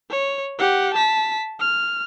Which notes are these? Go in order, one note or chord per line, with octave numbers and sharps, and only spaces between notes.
C#5
G4 F#5
A5 B6
F6